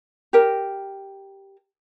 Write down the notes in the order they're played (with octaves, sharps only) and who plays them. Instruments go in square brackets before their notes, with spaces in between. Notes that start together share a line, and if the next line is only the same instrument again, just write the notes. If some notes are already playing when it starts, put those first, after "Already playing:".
[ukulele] G4 A#4